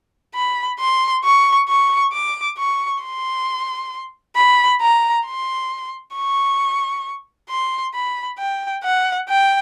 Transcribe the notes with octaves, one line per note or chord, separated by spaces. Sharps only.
B5
C6
C#6
C#6
D6
C#6
C6
B5
A#5
C6
C#6
C6
B5
G5
F#5
G5